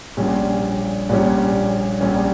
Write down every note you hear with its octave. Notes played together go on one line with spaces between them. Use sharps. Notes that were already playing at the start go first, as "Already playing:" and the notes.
A#1 A#2 G3 C#4
A#1 A#2 G3 C#4
A#1 A#2 G3 C#4